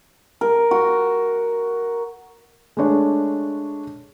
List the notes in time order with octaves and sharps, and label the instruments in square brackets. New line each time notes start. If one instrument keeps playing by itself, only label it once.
[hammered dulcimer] A#4
F#4
[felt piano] G#3 A3 D4 C#5